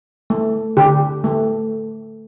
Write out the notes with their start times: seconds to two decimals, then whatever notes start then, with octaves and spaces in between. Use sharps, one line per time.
0.30 A3
0.77 D3 G4
1.24 A3